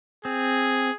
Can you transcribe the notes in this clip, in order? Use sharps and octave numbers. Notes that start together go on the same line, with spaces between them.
C4 G#4